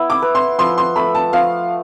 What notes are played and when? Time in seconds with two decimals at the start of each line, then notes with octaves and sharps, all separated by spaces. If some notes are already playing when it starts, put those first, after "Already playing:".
Already playing: B3 E4
0.10 D6
0.22 B4
0.35 C6
0.59 F3 C6
0.78 C6
0.96 A3 B5
1.15 A5
1.33 F3 F5